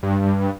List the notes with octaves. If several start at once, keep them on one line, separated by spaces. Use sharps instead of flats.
G2